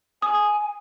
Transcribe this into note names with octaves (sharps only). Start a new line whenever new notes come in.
G#5 D#6